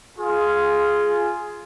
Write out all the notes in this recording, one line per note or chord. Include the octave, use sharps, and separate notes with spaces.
F4 G#4